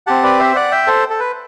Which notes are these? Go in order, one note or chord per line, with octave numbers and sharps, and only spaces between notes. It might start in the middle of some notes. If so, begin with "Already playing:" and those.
C4 G4 F#5 A5
B4 D5
C5 E5
D5 F#5
E5 G5
A4 C5
A4
B4